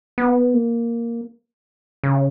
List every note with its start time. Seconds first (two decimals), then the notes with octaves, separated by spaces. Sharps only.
0.18 B3
0.54 A#3
2.04 C#3